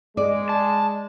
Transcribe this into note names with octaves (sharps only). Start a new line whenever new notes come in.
G#3 D5
A5